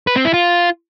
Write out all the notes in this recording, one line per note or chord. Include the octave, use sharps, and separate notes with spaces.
B4
C4
E4
F4